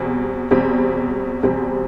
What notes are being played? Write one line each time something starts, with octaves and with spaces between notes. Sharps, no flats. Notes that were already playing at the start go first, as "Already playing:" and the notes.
Already playing: E2 B2 G3 C4
E2 B2 G3 C4
E2 B2 G3 C4